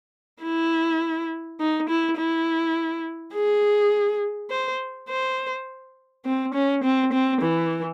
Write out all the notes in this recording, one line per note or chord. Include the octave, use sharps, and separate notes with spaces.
E4
D#4
E4
E4
G#4
C5
C5
C4
C#4
C4
C4
E3